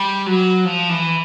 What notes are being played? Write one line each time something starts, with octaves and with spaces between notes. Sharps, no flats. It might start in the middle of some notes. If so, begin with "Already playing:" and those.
Already playing: G3
F#3
F3
E3